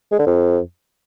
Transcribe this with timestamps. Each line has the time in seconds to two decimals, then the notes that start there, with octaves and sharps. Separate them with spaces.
0.12 G#3
0.19 D3
0.26 F2